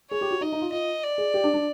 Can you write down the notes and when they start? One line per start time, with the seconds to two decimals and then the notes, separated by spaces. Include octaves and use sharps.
0.11 G#4 C#5
0.21 G4
0.31 F#4
0.41 D#4 D#5
0.52 D#4
0.62 F4
0.72 F4 D#5
1.03 D5
1.18 G#4
1.34 G4
1.44 D4
1.54 D4